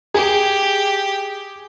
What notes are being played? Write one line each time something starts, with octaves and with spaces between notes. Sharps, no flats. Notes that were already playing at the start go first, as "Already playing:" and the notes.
G4 G#4